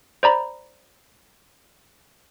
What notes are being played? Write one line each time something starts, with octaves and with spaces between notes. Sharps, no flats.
C5 D5 A#5 B5